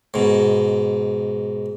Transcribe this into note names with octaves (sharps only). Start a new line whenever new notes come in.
G#2 B2